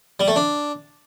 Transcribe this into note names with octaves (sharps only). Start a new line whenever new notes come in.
G3
A3
D4